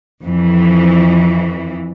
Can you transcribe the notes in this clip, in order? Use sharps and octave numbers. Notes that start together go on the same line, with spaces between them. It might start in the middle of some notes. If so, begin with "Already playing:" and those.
F2 E3